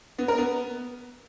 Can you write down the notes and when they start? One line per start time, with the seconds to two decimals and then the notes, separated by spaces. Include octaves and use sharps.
0.18 B3
0.28 A#4
0.38 B3